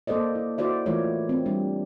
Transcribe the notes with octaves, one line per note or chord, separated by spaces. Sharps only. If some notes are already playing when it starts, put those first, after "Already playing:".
A#3 A4 C5 D5 D#5
E4
E4 F#4 C5 D5 E5
E3 A3 E4 F4 A#4 C#5
C4
G3 D4